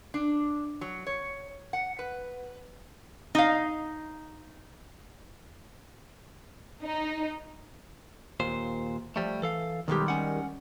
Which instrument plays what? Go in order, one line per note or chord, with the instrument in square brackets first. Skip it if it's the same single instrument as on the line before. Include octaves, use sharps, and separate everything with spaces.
[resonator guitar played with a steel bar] D4
F#3
C#5
F#5
B4
D#4 F5
[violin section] D#4
[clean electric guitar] D#2 A#2 C5
F3 G3 A3
E3 A4 F5
[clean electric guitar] B1 G4 [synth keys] D#3 G3 G#3
[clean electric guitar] C#4 F#5